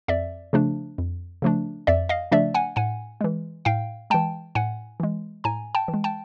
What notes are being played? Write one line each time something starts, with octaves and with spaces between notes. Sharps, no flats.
F2 D5 E5
C#3 F3 A3 D4
F2
C#3 F3 A3 D4
F2 D5 E5
D#5 F5
C#3 F3 A3 D4 D5 E5
F#5 G#5
A2 F#5 G#5
E3 G#3
A2 F5 G5
E3 G#3 G5 A5
A2 F#5 G#5
E3 G#3
A2 G#5 A#5
G5 A5
E3
G#3
G5 A5